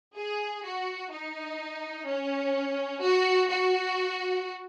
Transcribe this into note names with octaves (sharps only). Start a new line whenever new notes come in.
G#4
F#4
D#4
C#4
F#4
F#4